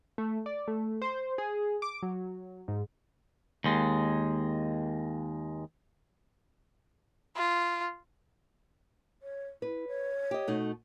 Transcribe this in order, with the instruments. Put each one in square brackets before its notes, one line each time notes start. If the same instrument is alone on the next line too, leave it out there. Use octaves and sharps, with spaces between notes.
[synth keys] A3
D5
A3
C5
G#4
D6
F#3
G#2
[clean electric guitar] D#2 G#3
[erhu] F4
[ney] C#5
[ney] E4 [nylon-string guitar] B4
[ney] C#5
[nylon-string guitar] G4 D#5
B2 A3 D#4